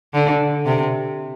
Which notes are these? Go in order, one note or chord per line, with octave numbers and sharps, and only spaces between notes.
D3
C3